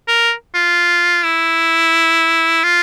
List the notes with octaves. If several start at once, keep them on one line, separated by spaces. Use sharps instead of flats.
A#4
F4
E4
F4